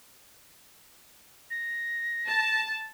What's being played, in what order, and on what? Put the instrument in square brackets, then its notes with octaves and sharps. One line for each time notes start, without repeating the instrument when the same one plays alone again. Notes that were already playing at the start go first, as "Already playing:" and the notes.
[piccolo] A#6
[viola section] A5